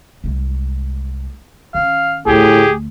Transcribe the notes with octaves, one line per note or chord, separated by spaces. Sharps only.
C2 G#3
D#3 C#4 F5
D2 A2 A3 G4 G#4